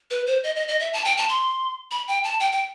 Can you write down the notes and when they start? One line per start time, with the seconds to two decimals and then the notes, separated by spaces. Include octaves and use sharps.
0.11 B4
0.27 C5
0.44 D#5
0.56 D#5
0.68 D#5
0.80 E5
0.93 A5
1.05 G5
1.17 A5
1.29 C6
1.91 B5
2.08 G5
2.24 A5
2.40 G5
2.52 G5